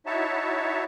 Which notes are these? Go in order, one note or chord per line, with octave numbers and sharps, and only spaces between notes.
D#4 E4 F#4 C#5 E5 A5